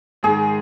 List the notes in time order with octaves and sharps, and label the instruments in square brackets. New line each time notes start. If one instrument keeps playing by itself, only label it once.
[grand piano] G#2 D#3 G#3 [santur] G#4